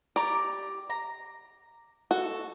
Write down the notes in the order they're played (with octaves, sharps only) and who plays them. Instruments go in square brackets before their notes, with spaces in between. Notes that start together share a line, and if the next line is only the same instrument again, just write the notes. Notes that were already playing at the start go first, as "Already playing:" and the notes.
[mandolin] G4 A#5 D6 [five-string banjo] D5
[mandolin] A#5
[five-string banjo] F#4 [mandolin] A4